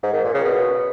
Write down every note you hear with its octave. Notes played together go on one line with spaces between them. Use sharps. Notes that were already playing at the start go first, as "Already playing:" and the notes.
G#2
D#3
A#2
C#3
B2